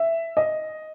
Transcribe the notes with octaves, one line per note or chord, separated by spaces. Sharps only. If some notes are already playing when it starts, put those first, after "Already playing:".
Already playing: E5
D#5